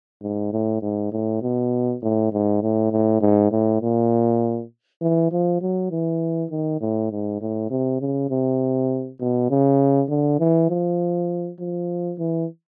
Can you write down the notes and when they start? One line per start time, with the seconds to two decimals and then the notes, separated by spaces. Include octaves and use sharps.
0.22 G#2
0.53 A2
0.82 G#2
1.12 A2
1.42 B2
2.02 A2
2.33 G#2
2.62 A2
2.92 A2
3.21 G#2
3.52 A2
3.82 A#2
5.02 E3
5.32 F3
5.61 F#3
5.91 E3
6.51 D#3
6.81 A2
7.11 G#2
7.41 A2
7.70 C3
8.00 C#3
8.30 C3
9.20 B2
9.50 C#3
10.09 D3
10.39 E3
10.70 F3
11.60 F3
12.19 E3